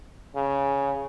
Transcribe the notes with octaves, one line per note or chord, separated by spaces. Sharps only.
C#3